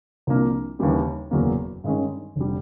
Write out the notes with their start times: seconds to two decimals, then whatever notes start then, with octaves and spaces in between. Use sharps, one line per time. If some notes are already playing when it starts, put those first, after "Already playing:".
0.27 C2 C3 F3 A#3 D4
0.79 D#2 C#3 E3 G3 A#3
1.31 F#1 E2 B2 F#3 A#3
1.84 G2 D#3 G#3 C#4
2.36 F1 D3 G3